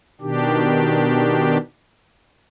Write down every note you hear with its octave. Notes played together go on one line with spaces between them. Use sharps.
B2 D#3 D4 G4